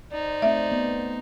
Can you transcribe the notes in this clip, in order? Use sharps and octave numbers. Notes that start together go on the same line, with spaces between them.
D#4 C5 D5
A3 C4 E5
B3